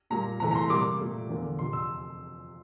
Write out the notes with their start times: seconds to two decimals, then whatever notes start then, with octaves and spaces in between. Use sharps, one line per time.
0.10 A#2 G3 A#3 A#5
0.40 C3 E3 A3 A#5
0.51 A#5
0.55 C6
0.70 C3 G3 A#3 D6
0.99 A#2 A3
1.29 E2 D3 F3 A#3
1.58 F2 C3 F3 C6
1.73 E6